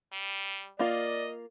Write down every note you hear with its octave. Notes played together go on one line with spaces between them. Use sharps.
G3
A#3 F4 D5 D#5